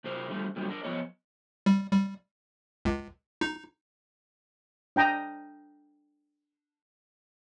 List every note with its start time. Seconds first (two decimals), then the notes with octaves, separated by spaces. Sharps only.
0.04 C3 D#4 A#4 C5
0.28 D3 D#3 G3 A3 C4
0.56 A#2 D3 D#3 F#3 G3
0.68 D4 A#4 D5
0.83 F3 B3 C#5 D#5
1.66 G3
1.92 G3
2.85 C#2
3.41 D#4
4.96 D4 G5 A#5 D#6